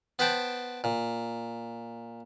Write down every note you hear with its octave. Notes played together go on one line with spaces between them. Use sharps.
B3 B4 C5 F#5 G5 A5
A#2